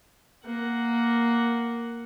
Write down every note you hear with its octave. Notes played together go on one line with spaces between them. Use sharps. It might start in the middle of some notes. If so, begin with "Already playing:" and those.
A#3 F#5